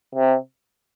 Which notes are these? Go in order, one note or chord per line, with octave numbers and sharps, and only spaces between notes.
C3